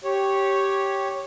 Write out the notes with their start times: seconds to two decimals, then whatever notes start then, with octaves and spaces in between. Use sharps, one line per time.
0.04 G4 C#5